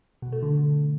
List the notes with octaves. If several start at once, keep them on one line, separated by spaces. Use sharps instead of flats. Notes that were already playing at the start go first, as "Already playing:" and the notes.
B2
A3
D3